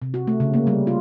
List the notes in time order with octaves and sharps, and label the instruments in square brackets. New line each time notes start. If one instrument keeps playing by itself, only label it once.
[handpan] C3
F#4
A3
C#3
A#3
G3
F4